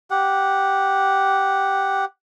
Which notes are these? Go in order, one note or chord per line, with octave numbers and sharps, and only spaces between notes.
G4 F#5